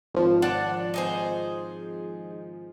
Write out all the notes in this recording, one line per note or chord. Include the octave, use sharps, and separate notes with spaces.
G#1 F3
D4 F#5
D#4 G#4 C5